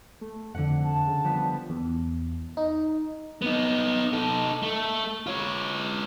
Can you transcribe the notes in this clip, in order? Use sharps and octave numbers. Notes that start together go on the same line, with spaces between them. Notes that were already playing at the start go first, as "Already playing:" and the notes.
A3
F2 D3 F#5
A5
C#3
F3 G3 B3
E2
D#4
B3 D#4
D#4 A4
A3
F4 C#5